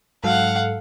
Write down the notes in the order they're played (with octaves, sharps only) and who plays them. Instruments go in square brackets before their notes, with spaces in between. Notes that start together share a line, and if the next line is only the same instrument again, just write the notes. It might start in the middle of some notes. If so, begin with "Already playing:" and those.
[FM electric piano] G#2 F#3 A4 [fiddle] F5 F#5